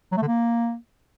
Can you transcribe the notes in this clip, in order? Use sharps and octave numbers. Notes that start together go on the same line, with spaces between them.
F#3
A3
D3
A#3